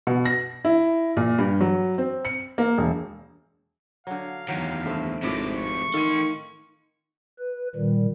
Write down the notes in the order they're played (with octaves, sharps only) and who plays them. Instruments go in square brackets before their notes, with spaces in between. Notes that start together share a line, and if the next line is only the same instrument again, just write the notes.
[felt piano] B2
A#6
E4
A#2
G2
F#3
C4
C#7
A#3
E1
[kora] D3 F#3 [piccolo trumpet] F5
[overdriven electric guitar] E2 D#3 [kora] F#3
[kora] G2 A3 C4
[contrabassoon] G#1 [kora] A2 D#5 [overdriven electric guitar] C3 F3 [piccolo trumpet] D6
[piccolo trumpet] C#6
[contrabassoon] D#3 [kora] F4 [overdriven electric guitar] A4 C6
[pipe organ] B4
A#2 D#3 G3